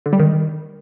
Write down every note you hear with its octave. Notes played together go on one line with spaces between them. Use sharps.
D3
G3
D#3